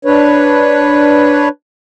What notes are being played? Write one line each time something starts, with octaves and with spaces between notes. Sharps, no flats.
D4 B4 C#5